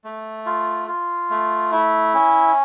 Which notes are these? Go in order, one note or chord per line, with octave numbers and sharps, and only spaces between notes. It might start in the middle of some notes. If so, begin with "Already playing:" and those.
A3
F4
F4
A3
E4
C#4